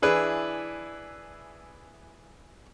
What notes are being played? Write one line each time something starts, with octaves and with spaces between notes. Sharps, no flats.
E3 D4 E4 G#4 B4